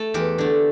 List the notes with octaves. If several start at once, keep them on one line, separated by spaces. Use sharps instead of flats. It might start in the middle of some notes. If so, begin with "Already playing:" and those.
Already playing: A3 A4
E2 G4
D3 A3